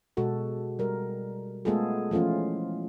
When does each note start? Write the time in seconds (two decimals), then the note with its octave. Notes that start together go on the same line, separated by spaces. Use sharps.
0.17 B2 G#3 F#4 A4
0.79 G3 A#4
1.65 G#3 A3 B3 F4 G#4 A4
2.11 E3 F3 A3 C#4 F4